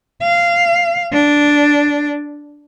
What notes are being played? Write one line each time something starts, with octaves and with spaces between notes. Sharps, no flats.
F5
D4